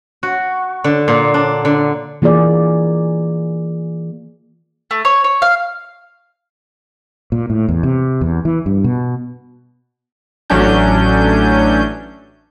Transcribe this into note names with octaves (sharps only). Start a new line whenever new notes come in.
F#4
D3
A#2
D4
D3
E3 A#3 F4 G#4 D5
A3
C#5
C#5
F5
A#2
A2
E2
C3
E2
E3
G2
B2
A1 F#3 A3 C#4 D4 G6